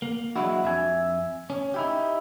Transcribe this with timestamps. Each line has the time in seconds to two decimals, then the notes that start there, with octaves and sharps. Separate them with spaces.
0.02 A#3
0.36 F#3 G#3 D4 E4 F#4
0.63 F2 E5 G#5
1.50 C#4
1.74 D#4 E4 G4